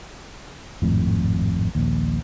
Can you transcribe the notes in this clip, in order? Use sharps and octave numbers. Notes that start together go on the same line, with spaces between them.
G#1 F2 A2
A#1 D#2